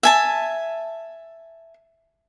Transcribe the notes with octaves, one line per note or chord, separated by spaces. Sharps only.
E5 G#5 A5